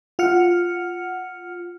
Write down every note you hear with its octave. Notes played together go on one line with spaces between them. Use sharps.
F4 F#5 F6 C#7